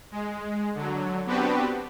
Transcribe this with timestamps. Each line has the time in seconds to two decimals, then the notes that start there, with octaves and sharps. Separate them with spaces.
0.12 G#3
0.75 D3 F#3
1.26 B3 C4 D4 F#4 G4 B4